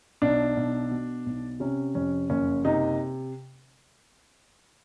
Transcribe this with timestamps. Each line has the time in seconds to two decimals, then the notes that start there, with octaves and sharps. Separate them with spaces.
0.22 B1 D4
0.57 B1
0.91 B2
1.26 B1
1.60 C3 C#4
1.95 F2 C#4
2.30 F#1 C#4
2.65 C3 D#4